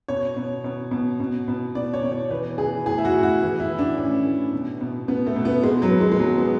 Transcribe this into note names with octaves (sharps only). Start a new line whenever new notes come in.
B2 C#5
B2
B2
B2
B2
B2
B2 D5
C#5
B2
C#5
E3 B4
E3 G#4
A2 G#4
E4
F#4
A2
F#4
E3
E4
E3
D4
A2 C#4
A2
B2
B2
B2 B3
A3
B2
B3
B2 G#3
F#3
B2
G#3
G#3
B2 F#3
B3